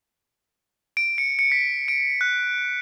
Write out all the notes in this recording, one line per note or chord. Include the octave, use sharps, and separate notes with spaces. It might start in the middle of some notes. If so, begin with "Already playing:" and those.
D7
C#7
C#7
B6
D7
F#6